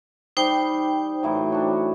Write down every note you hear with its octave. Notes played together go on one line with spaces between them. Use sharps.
G3 D#4 C5 G5 D6
A2 E3 F#3
D4 F#4